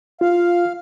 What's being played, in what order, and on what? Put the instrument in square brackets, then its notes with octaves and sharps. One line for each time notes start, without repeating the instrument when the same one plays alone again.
[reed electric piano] F4 [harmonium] F5